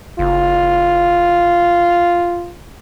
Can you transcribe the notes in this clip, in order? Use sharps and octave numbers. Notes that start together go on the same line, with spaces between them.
F#1 F4